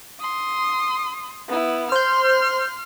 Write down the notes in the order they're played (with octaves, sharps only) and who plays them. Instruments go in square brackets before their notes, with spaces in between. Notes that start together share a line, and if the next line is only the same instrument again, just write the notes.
[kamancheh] C6 D#6
B3 E4
[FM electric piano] C5 G6 [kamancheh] C6 F6